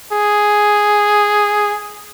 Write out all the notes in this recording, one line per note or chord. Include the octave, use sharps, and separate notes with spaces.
G#4